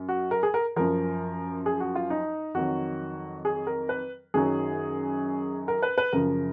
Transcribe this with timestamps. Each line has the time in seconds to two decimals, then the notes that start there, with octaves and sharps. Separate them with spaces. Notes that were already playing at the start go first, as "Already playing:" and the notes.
Already playing: F#2
0.09 F#4
0.31 A#4
0.43 G#4
0.54 A#4
0.76 F#2 F3 A#4
1.66 G#4
1.80 F#4
1.95 F4
2.10 D#4
2.54 F2 D#3 F#3 F#4
3.45 G#4
3.67 A#4
3.89 B4
4.34 F#2 D#3 F#3 G#4
5.68 A#4
5.83 B4
5.98 B4
6.13 F#2 C#3 F3 A#4